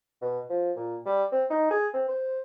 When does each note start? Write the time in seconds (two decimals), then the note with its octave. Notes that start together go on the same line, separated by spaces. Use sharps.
0.22 B2
0.50 F3
0.76 A#2
1.06 G3
1.32 C4
1.50 D#4
1.71 G#4
1.93 C4
2.08 C5